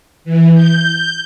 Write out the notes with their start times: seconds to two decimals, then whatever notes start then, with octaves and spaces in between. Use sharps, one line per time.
0.25 E3
0.54 G6